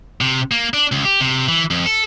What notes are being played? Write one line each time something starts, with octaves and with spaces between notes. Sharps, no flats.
C3
A#3
D4
C#2
G4
C3
E3
F2
A4